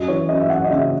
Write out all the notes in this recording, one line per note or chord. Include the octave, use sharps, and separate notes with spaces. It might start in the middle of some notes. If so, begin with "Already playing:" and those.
Already playing: F#2 D#5
E3 C#5
F#2 D#5
E5
F#2 F#5
D#5
C#3 E5